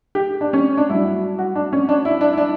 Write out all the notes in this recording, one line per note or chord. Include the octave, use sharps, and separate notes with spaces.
G4
D4
C#4
D4
G2 F#3 E4
F#4
D4
C#4
D4
E4
D4
E4
D4